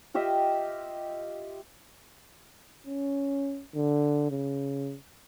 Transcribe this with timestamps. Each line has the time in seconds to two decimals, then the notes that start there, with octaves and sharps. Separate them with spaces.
0.14 F4 G4 D#5 E5
2.87 C#4
3.75 D3
4.31 C#3